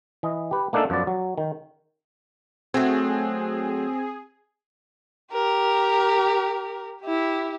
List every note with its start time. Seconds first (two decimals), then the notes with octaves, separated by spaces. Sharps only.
0.23 E3 D#5
0.51 G4 B4
0.73 A3 A#3 D4 D#4 G#4 A4
0.90 F#2 F3 B3 D5
1.07 F#3
1.38 D#3
2.74 F#3 A3 C4 G#4
5.32 G4 A#4
7.02 E4 G4